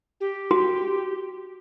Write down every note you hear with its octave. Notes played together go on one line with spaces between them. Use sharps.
G4
F#4